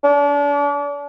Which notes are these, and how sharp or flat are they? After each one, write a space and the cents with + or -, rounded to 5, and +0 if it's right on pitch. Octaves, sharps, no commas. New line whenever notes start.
D4 -35